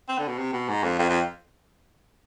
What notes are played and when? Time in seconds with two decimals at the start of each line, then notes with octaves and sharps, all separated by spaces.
0.09 C4
0.18 D3
0.28 B2
0.38 C3
0.53 B2
0.68 G#2
0.83 F2
0.99 F2
1.09 F2